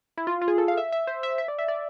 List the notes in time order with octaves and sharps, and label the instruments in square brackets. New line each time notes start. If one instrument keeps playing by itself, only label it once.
[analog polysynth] E4
F4
F4
G#4
A4
F5
E5
E5
C5
E5
E5
D5
E5
D5